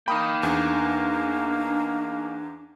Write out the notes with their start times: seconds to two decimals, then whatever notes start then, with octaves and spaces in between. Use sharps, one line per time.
0.08 A#3 D#4 G5 B5 D#6
0.43 E2 D4